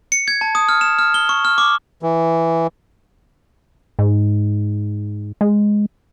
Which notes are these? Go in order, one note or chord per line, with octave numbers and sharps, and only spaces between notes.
C#7
G#6
A5
D#6
F6
E7
F6
G7
C#6
F6
D6
E3
G#2
G#3